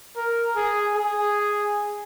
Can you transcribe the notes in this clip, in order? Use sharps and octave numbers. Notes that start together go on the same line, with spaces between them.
A#4
G#4
G#4